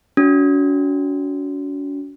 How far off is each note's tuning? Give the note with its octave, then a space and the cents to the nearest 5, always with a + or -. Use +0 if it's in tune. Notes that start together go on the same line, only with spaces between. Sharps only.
C#4 +45 F#4 +0